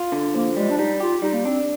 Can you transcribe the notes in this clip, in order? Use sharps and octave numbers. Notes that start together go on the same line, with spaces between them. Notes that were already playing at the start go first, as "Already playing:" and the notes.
Already playing: F4
D3
F3 A#3
G3 G#3
D4
G3 D#4
F4 G4
G3 D#4
A#3
C4 D4